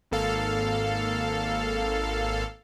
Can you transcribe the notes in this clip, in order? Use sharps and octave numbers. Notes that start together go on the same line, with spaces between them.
G#1 A#3 A4 F5